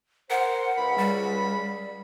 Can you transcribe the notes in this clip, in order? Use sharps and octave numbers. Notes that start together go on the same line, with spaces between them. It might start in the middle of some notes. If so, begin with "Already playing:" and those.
A#4 C5 F#5
C#2 B5
G3